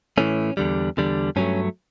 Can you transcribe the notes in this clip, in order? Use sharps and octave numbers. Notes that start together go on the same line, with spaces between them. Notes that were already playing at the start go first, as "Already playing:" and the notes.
A2 E3 A3 C#4
E2 D3 G3
E2 D3 G3
G2 F#3 A3 C#4